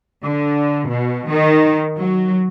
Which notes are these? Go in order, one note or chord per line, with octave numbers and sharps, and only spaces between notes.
D3
B2
D#3
F#3